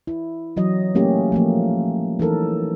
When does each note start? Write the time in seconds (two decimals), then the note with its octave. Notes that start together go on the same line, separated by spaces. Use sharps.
0.07 E4
0.56 E3 F#3 D#5
0.95 A3 A#3 C#4 G4
1.32 F3 A3 A#3
2.19 E3 D#4 A4 A#4